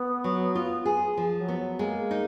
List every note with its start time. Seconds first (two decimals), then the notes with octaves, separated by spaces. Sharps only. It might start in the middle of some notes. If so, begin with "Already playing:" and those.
Already playing: B3
0.24 F#3
0.55 F4
0.86 G#4
1.17 F3
1.37 F#3
1.48 B3
1.59 F#3
1.79 G#3 A#3
2.11 D#4